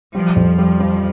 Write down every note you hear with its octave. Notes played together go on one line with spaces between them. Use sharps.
F3 G3
F2
G3
G3